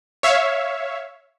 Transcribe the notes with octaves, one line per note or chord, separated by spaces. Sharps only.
C#5 E5 F5